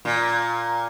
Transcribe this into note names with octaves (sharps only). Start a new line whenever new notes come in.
A#2